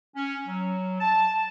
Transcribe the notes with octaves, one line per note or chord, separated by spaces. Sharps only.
C#4
F#3
A5